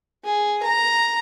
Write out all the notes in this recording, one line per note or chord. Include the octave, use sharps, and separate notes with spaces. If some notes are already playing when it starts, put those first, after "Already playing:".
G#4
A#5